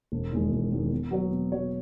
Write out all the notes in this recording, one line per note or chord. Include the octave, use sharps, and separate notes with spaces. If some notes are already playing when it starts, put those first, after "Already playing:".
E1
E2 D#3 G#3
E1
E2 D#3 G#3
B2
F#3 B3 F#4 C#5
B2
F#3 B3 F#4 C#5